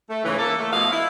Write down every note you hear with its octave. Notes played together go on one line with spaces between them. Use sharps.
A3
G#2 C#3 E3
A#3 A4
A3
B2 F3 E4 D#5 F5
E4